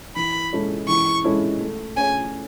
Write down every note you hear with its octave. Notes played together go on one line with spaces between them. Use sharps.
E3 B5
G#3 C#4 E4 A4
E3 C#6
G#3 C#4 E4 A4
A3
C#4 G#4 C#5 G#5